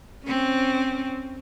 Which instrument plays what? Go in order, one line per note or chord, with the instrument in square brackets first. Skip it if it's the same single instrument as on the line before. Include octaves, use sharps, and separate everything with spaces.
[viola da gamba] C4 C#4